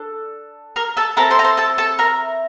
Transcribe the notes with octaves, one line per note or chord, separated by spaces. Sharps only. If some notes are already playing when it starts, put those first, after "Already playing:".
Already playing: D4 A4
A#4 A#5
A4 A5
C4 E4 A4 A#4 A#5
C5 C6
A#5
C5 C6
A4 A5
A4 A5
A#4 A#5